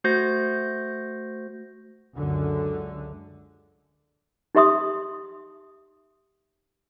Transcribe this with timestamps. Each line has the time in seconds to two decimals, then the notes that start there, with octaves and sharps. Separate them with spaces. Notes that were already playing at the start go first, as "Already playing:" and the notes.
0.04 A3 F#4 C5 G6 A#6
2.14 C#2 F#2 D3
4.55 D#4 G4 E5 C6 D#6